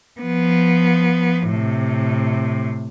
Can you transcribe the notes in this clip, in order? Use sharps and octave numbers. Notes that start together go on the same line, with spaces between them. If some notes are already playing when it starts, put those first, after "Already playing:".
F3 B3
A2 C3